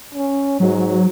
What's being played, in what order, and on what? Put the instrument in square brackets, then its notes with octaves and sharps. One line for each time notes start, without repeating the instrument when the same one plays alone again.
[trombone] C#4
[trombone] G#2 [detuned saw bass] F#3